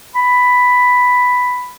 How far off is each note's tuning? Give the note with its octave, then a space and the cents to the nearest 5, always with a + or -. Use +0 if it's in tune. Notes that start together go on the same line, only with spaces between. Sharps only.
B5 +5